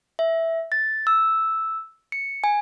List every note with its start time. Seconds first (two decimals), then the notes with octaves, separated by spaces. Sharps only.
0.19 E5
0.72 A6
1.07 E6
2.12 C#7
2.44 G#5